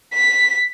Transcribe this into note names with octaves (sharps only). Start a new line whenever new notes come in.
B6